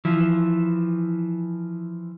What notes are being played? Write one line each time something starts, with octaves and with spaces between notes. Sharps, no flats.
E3 F3